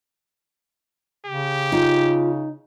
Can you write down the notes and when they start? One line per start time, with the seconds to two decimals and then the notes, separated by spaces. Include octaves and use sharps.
1.27 C#3 G4
1.72 D#4 F4